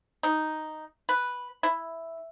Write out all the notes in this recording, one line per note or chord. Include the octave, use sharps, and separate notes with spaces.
D#4
B4
E4